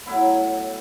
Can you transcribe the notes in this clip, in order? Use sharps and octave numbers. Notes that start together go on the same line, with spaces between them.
A2 F#3 B3 E4